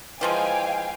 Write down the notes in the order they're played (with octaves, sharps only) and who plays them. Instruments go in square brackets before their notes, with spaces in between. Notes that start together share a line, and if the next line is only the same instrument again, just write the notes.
[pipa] E3 F3 G#3 [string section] F5 G5 G#5